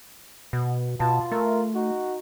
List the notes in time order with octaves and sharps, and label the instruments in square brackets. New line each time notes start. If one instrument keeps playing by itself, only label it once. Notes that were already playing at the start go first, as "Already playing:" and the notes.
[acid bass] B2
[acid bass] B2 [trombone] F4 [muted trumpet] A5
[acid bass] A3 [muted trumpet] A#4
[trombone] D#4 [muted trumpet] F#4